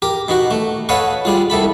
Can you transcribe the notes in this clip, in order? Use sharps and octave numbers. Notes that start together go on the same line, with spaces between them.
G4 A#4
B2 D#4 F#4
A3
A4 B4 C#5 D#5 F5 F#5
G3 G#3 F4
C2 C3 A4 B5